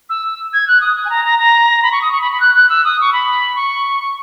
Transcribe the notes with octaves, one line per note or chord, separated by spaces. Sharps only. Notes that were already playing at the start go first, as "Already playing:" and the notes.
E6
G#6
F#6
D#6
D#6
G#5
A#5
A#5
A#5
B5
C#6
D#6
C#6
B5
B5
F#6
F#6
E6
D#6
C#6
B5
C#6